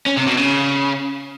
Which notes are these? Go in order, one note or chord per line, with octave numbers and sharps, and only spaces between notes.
C#4
C3
B2
C#3